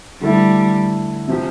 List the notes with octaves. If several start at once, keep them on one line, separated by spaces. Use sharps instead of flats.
D3 G3 A3 E4 A4
C3 F3 C4 G4